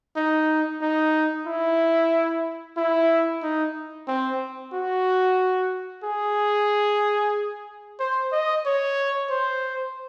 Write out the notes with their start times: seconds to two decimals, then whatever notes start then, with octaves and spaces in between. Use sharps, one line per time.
0.16 D#4
0.81 D#4
1.46 E4
2.77 E4
3.43 D#4
4.08 C4
4.73 F#4
6.04 G#4
7.99 C5
8.32 D#5
8.65 C#5
9.30 C5